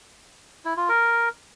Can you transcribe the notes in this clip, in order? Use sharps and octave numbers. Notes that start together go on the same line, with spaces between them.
E4
F4
A#4